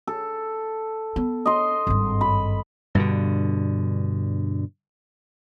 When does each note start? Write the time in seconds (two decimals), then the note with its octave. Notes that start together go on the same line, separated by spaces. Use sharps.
0.07 A4
1.16 B3
1.46 D#5 C6
1.87 G#1 G2
2.21 B5
2.95 G2 B2 D3